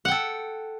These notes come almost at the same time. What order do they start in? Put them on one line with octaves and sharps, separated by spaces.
F#5 G5 A4